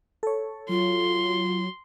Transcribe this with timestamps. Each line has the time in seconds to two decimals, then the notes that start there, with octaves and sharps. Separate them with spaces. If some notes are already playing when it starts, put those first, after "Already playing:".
0.23 A4 C#5
0.69 F#3 F4 C6